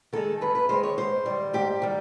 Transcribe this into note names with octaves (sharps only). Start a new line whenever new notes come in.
D#3 G#3 A4
F#2 B4
B4
D#3 G#3 C5
C#5
G#2 C5
D#3 G3
G#2 G4
D#3 G3